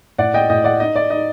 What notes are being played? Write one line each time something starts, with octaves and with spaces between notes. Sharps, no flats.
A2 D5 F#5
D#5 G5
A2 D#5 G5
D5 F#5
D#4 D#5
D5
D#4 D#5